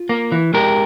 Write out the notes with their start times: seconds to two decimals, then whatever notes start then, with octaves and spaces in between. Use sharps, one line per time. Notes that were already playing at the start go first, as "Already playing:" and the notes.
Already playing: F4
0.09 A#3
0.32 E3
0.54 G#3 G4 A#4